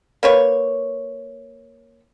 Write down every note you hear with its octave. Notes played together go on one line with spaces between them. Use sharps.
A#3 B4 C#5